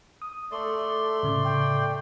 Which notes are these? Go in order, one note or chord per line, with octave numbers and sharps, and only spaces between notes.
D#6
A3 A4 D5 C6
A2 C#3
G5